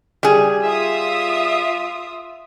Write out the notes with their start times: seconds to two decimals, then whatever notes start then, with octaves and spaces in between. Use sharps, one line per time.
0.23 G3 G#4
0.61 F4 E5 D#6